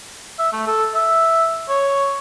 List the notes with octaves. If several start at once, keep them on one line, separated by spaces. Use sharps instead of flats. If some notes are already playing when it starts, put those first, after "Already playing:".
E5
A3
A4
E5
C#5